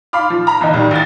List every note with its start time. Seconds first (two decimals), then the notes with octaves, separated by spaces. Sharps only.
0.13 F5 B5 C6 D6 F6
0.30 F3
0.47 A#5 B5
0.61 G1 E3 D#4
0.74 B1 D#3 G3
0.91 A1 A6